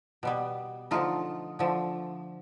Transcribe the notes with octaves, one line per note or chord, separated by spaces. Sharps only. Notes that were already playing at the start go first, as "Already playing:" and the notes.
B2 G3 B3
D3 F3 A3 D#4 F4
D3 F3 A3